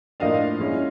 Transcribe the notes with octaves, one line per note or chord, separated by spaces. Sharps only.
A2 F3 A#3 D4 D#5 F5
F3 G#3 C#4 E4